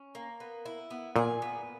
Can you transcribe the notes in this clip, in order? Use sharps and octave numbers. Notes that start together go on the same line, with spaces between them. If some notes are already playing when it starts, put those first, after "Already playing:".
Already playing: C#4
A#3
B3
E4
B3
A#2 G#4
B3